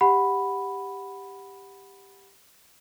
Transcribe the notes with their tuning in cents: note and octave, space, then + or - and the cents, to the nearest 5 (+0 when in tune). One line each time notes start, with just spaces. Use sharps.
G4 +10 F#5 +0 B5 +0